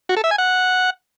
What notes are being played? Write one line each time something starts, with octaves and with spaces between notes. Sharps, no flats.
F#4
A4
E5
G#5
F#5